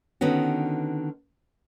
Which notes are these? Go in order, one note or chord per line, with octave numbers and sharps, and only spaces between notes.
D3 D#3 B3 C#4 F#4